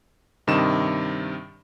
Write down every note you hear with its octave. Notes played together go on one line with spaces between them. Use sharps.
G2 C3 D#3 D#5 E7